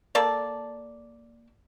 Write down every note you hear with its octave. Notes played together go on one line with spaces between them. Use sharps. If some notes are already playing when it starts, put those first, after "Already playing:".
A#3 A4 D5